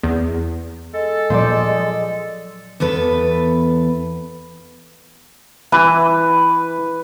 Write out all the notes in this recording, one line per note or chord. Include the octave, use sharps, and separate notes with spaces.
E2
G#3 A4
A#2 F3 F#3 C5 D5
E2 B3 A4 B4
E3 B4